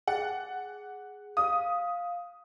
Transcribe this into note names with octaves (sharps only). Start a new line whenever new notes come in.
G#4 F#5
F5 D#6